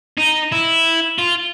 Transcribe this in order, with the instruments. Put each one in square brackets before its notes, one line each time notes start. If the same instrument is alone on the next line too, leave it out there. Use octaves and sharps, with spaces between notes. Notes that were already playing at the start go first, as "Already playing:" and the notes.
[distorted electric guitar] D#4
E4
F4